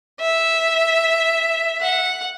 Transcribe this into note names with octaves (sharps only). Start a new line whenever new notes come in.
E5
F#5